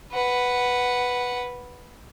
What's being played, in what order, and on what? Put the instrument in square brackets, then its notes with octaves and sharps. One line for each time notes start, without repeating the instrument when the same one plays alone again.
[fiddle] B4 F#5